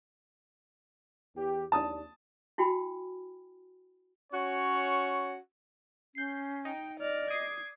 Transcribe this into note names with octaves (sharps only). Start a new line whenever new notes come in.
E2 G4
D#2 D4 A5 D#6
E4 F#4 G5 G#5 B5
C#4 F#4 C#5
C#4 G6 C7
D#4 G5
D5 D#5 F6
D6 D#6 G#6 C7